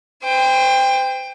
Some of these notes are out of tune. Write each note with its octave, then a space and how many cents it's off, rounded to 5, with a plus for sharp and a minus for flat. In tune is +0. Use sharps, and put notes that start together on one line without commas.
C5 -30 G5 +20